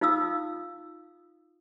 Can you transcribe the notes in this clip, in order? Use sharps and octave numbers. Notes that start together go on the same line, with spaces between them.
D#4 F4 F5 D#6 E6